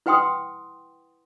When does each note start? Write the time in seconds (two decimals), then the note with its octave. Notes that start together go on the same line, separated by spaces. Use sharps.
0.06 E4 B4 F#5 G5 C6 D#6